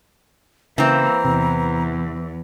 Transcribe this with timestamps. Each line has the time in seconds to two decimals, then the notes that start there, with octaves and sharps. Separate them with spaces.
0.78 C#3 E3 A#3 C4 A#5
1.25 E2 C3